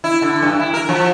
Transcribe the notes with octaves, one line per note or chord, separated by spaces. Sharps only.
E4
D3
G2
E4
A#4
F3